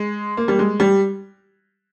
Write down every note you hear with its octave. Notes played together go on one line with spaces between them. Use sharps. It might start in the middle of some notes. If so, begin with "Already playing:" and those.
Already playing: G#3
A#3
G3
G#3
G3